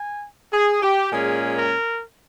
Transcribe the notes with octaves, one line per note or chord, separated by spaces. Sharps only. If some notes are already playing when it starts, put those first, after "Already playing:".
Already playing: G#5
G#4
G4
A#2 G#3 C#4 G#4
A#4